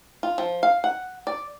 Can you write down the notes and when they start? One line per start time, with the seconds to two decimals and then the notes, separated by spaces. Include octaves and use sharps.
0.23 F4
0.38 F3
0.63 F5
0.84 F#5
1.27 D5